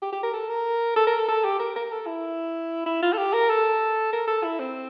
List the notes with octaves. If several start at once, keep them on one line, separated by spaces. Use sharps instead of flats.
G4
G4
A#4
A4
A#4
A4
A#4
A4
A4
G4
A#4
A#4
A4
E4
E4
F4
A4
G4
A#4
A4
A#4
A4
E4
C4